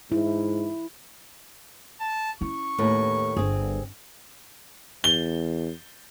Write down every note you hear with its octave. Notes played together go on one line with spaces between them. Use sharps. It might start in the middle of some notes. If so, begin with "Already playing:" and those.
G#2 E4
A5
C#4 E4 C#6
D#2 A2 B4
G1 C4 G#4
E2 G7